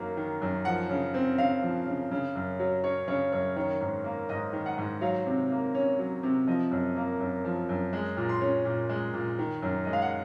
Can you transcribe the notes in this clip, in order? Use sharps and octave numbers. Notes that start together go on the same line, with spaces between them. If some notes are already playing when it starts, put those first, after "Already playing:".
Already playing: F#2 D#3 F#3 A#3
D#3
F#2
F3 F#5
C#3
C4
C#3 F5
F3
C#3
C#3
F#2
F#3
C#4 C#5
C#3 C#5
F#2 C#5
D#3 C#5
G#2
A#3
G#2 D#5
D#3
F#5
G#2
F#3 F5
C3
A#3
C#4
F#3
C3
F3 D#5
F#2
A#3
F#2
F3
F#2
G#3
A#2
C6
C#4
A#2
G#3
A#2
D#3
F#2
G#3 D#5
F5
F#5